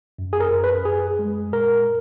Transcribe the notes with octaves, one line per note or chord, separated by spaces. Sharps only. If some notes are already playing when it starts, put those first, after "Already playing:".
F#2
G#4
A#4
F#2
B4
F#2 G#4
G#3
A#2 A#4